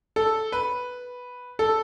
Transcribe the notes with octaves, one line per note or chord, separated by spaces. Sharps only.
A4
B4
A4